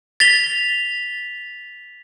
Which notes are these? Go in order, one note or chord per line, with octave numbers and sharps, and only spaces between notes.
A6 B6 F7 G7